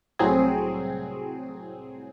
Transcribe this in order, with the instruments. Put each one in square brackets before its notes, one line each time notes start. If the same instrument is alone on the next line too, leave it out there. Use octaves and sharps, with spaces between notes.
[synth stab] C2 A2 F#3 C4 G#4